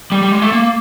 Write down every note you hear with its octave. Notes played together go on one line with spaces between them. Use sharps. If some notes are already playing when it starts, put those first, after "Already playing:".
G3
G3
G#3
A3
A#3